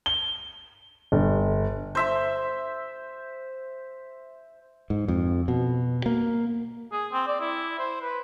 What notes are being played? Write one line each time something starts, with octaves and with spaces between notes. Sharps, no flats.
G7
G1
C5 E5 C6
G#2
F2
B2
A#3
G#4
C4
D5
E4
C5
B4